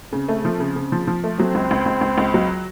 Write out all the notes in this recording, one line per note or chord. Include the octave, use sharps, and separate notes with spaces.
C#3 C4
A3
F3
C#3
C#3
F3
F3
A3
F#3 C4
C#2
C#2
C#2
C#2
C#2
F#3